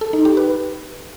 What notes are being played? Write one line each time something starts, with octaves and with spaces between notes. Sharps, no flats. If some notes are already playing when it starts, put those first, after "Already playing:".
A4
D#4
G4
B4